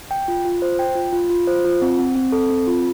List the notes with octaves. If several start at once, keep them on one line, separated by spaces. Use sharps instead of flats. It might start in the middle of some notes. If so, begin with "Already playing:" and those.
G5
F4
F4
C5
G5
F4
F4
F4
C5
F4
C4
C4
C4
A4
C4
F4